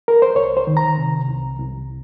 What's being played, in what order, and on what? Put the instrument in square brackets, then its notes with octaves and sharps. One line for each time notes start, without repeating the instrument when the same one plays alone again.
[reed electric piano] A#4
C5
C2 C#5
C5
D#3
A#5
C3
C2
C2